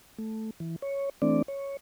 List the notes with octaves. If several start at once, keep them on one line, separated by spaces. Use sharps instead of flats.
A3
E3
C#5
E3 A3 C4 D4 D5
C#5